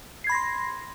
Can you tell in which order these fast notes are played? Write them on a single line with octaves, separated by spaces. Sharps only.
C7 G#6 B5 A#6 C6